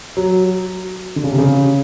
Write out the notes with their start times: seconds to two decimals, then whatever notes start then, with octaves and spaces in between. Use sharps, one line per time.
0.17 F#3
1.16 D3
1.24 C#3
1.31 C3
1.38 C#3